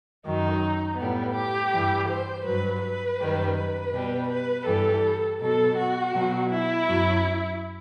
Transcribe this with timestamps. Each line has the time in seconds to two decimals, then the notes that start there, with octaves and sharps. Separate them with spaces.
0.25 F#2 D#3 F#3 D#4
0.98 A2 G3 B3
1.35 G4
1.72 G2 E3 G3
2.09 C5
2.45 G2 F#3 B4
2.82 B4
3.20 F#2 D#3 G3
3.56 B4
3.93 B2 G3
4.29 B4
4.66 G2 E3 G3 A4
5.40 B2 F#3 A4
5.77 F#4
6.12 B2 F#3
6.49 E4
6.87 F#2 F#3